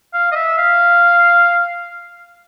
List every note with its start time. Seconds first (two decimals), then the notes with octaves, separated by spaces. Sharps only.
0.14 F5
0.32 D#5
0.35 E5
0.58 F5